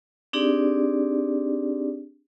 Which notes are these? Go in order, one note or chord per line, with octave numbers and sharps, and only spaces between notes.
C4 D4 D#4 G4 G#4 D5